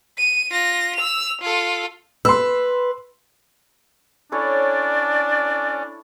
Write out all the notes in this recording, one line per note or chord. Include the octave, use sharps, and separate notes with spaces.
D#7
F4 A#6
E6 F7
F4 A4
B4 C6 E6
C#4 D4 E4 A4 C#5 D5